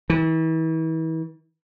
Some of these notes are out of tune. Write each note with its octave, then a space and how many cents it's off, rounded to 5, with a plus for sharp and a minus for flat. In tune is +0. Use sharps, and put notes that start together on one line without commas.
E3 -35